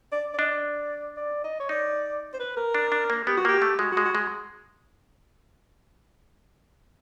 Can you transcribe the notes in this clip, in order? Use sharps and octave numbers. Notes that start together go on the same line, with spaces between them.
D5
D5
D4 D#5
D5
D5
D#5
C#5
D#4 D5
C5
B4
A#4
D4
D4
A#3
B3 G4
F#4
A#3 G4
A3
G#3 F#4
F#4
G#3
F#4
G#3